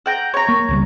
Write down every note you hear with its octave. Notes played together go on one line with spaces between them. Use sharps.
F#5 G5 A#5
C#5 A#5
A#3
C#2 C#3 G3